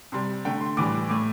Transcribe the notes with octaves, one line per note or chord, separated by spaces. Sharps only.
C3 G3 C6
D3 A3 G5
C6
A2 E3 G3 D6
A2 A3 D6